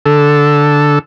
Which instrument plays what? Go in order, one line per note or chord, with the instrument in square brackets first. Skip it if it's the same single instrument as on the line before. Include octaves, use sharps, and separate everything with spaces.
[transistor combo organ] D3 A4